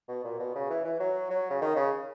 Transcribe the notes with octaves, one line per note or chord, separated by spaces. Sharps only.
B2
A#2
B2
C#3
E3
E3
F#3
F#3
C#3
D#3
C#3